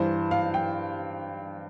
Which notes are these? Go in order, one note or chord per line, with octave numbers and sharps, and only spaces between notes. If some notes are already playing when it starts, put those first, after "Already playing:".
Already playing: G2 E3 C5
F5
G5